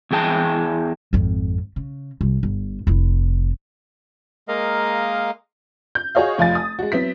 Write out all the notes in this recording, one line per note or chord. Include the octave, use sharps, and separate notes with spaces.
E2 E3 G#4 G5 A5
G#1 F2
C#3
C2
G1
F1 E4
G#3 A#3 A#4 D#5 F5
G6
F#4 G#4 C#5 D#5 F5
F1 F3 F4 G#5 A6
D#6
G#3 F#4
F#3 B3 C4 E4 B6